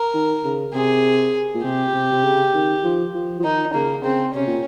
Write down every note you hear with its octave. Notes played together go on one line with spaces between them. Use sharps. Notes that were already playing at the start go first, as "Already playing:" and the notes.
Already playing: A#4
D#3
C#3
C3 G#4
A#2
C3 G4
C3
C3
C#3
D#3
F3
F3
F3
D#3 D#4
C#3 A#3
C#3 C4
C3 C#4
A#2